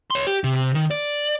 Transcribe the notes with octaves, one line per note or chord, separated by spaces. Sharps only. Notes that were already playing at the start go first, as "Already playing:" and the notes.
C#5 C6
G4
C3
D#3
D5